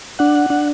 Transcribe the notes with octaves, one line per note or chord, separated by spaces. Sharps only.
D4 F#5
D4